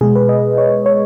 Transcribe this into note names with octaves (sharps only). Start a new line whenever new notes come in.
B2 G#3 G#4
B4
D#5
C#5
C#5